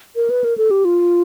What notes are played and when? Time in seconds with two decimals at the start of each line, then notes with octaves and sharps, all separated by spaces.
0.16 A#4
0.30 B4
0.44 A#4
0.58 A4
0.71 G4
0.85 F4